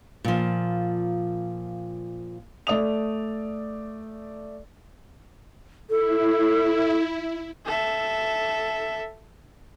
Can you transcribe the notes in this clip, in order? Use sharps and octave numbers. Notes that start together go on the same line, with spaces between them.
A#2 F3
A3 D5 D#6 F7
E4 A4
A4 E5